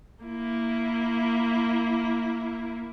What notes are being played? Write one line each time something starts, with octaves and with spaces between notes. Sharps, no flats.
A#3 E4